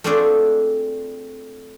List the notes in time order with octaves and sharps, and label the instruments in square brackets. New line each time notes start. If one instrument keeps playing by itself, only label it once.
[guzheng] A3 C4 D4 F4 G#4 D5